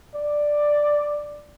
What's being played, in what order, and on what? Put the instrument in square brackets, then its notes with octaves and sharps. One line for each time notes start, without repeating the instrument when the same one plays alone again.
[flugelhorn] D5